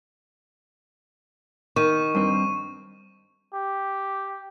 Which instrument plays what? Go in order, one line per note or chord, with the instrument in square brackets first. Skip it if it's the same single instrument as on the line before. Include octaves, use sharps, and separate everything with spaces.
[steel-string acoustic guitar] D#3 [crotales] C#6 D#7
[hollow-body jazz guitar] G2 C4
[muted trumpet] G4